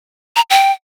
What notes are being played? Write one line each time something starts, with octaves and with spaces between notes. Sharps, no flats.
A#5
G5